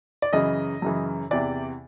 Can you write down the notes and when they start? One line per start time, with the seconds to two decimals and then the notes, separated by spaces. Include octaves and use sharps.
0.22 D5
0.33 F#2 C#3 E3 D#5
0.82 F#2 C#3 E3
1.31 E2 C3 E3 D5